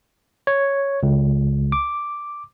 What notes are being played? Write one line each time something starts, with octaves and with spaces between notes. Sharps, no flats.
C#5
C#2
D6